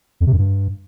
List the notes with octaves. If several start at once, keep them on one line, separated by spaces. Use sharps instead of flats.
F2
C3
F#2
G2